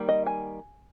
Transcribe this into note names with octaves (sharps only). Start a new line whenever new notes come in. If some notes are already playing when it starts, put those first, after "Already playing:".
Already playing: D#3 G3 A#3
D#5
G#5